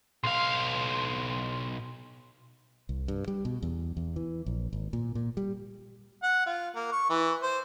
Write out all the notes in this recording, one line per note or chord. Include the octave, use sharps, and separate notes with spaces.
B1 F5 C6
C2
G2
G3
B2
E2
E2
E3
A#1
G#1
A#2
A#2
G3
F#5
F4
A#3
C#6
E3
C5